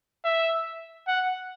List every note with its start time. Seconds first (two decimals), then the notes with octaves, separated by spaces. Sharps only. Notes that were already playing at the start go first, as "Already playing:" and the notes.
0.25 E5
1.08 F#5